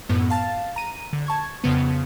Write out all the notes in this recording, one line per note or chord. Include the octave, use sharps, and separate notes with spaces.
F#2 A2 B3
F5 A5 A6
A#5 D#7
D3
A5 C#6 G#6
F2 C#3 B3